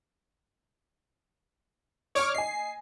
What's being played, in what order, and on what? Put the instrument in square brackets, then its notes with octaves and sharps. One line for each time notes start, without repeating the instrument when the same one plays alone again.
[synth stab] C#5 D6 F6 [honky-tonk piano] D5 C#6
[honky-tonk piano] D#5 G#5 [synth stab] C7